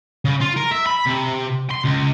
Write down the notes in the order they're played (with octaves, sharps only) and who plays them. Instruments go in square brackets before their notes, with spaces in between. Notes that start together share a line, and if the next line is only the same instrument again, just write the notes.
[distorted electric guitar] C#3
F4
A#4
E5
B5
C3
C6
C#2